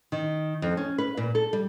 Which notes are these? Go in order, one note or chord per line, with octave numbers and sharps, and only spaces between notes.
D#3
F2
C#4
B4
A#2
A4
G3